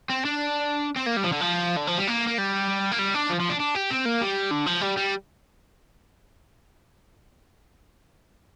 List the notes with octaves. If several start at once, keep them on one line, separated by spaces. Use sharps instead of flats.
C4
D4
C4
A#3
G3
F3
D3
F3
D3
F3
G3
A#3
A#3
G3
A#3
G3
D4
F3
F3
D4
D4
G4
C4
A#3
G3
D3
F3
G3
G3